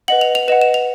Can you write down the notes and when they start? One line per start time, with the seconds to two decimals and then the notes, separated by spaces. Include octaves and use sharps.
0.08 B4 D#5 F#5 F#7
0.21 F7
0.35 F7
0.48 B4 D#5 F#5 E7
0.61 E7
0.74 F7